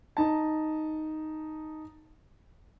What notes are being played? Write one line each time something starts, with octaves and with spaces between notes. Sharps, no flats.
D#4 A5